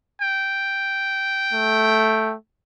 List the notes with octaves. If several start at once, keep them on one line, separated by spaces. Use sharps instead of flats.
G5
A3